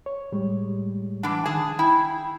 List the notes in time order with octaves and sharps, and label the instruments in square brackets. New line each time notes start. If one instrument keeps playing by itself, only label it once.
[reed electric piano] C#5
A2 G3 G#3
[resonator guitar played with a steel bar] E3 D4 [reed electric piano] F#5 D6
[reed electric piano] D#3 G#5 G#6 [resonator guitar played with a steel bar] G#4 A5
[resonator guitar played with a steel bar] E4 [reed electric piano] G5